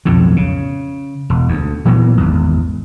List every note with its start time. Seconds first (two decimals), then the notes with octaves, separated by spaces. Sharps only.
0.05 B1 F2 A2 D3
0.36 C#3
1.30 E1
1.48 D2
1.85 A#2 E3 F#3 B3
2.17 G#1 E2